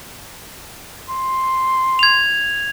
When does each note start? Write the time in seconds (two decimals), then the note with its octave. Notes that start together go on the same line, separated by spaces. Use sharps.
1.10 C6
1.99 G#6 F7